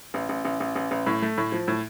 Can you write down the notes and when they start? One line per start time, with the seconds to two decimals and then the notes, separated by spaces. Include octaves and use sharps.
0.14 A1
0.29 A1
0.45 A1
0.60 A1
0.75 A1
0.91 A1
1.06 A2
1.22 A3
1.38 A2
1.52 F3
1.68 A2